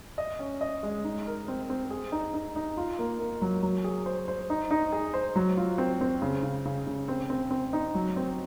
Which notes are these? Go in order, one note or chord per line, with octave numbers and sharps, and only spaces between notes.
D#5
C#4
D#5
G#3
D#4
A#4
C4
C4
G#4
D#4
D#4
D#4
F4
A#3
A#3
F#3
F#3
G#4
C5
C5
D#4
D#4
G#4
C5
F#3
F4
C4
C4
C#3
C#3
C#3
C#3
C4
C4
C4
D#4
F#3
C4